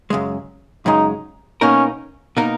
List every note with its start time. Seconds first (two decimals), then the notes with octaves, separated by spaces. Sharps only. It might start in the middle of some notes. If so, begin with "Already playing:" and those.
0.10 F#2 C#3 G#3
0.86 F#2 C#3 G#3 D#4
1.61 B2 A#3 C#4 D#4 A#4
2.37 B2 A#3 D#4 A#4